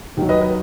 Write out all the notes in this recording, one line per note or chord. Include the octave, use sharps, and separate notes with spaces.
D#2 D#3 F#3
B4 D#5
B4